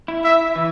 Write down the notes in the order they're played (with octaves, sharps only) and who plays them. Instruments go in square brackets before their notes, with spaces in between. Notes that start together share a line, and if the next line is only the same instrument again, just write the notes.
[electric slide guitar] E4
[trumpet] E5
[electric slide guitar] E3